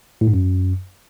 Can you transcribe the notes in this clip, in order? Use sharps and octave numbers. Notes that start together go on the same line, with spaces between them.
A2
G#2
F#2